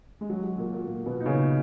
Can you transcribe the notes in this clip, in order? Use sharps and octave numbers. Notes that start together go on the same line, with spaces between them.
G#3
F#3
F#3
A#2 A#3
A#2 A#3
A#2 A#3
B2 B3
D#4
C#3 C#4